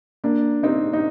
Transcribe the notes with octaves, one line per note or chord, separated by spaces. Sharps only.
A#3 D4
C4 D#4
D#4